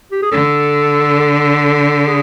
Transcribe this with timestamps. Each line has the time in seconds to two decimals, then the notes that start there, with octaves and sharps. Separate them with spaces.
0.12 G4
0.23 G#4
0.32 D3 A4
1.20 A4
2.07 G#4